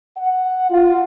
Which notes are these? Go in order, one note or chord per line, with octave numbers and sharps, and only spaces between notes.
F#5
F4